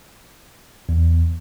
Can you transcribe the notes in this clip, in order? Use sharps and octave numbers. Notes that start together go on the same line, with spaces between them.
E2